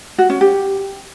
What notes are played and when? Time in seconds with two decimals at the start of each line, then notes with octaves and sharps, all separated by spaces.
0.18 F#4
0.30 C#4
0.41 G4